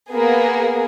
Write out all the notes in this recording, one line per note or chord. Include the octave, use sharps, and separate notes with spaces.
A#3 B3 G#4